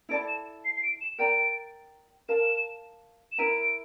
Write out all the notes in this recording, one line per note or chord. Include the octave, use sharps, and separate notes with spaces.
E4 A4 D5 A5 D7
E7
C7
C7
D7
E7
A#4 D5 G5 A#5 D7
A#4 F5 A5 E7
E7
E4 A#4 E5 A#5 D7